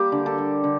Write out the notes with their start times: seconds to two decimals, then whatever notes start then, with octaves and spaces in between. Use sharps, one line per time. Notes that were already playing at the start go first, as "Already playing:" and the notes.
Already playing: G3 A#3 G4
0.12 D3
0.26 A4
0.38 G3
0.64 D3